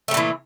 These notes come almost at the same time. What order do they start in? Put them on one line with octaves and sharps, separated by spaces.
A3 G3 A#2 E3